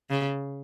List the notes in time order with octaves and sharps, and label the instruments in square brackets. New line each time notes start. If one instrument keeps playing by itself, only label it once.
[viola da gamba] C#3